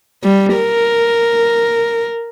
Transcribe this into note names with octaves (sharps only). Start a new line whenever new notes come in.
G3
A#4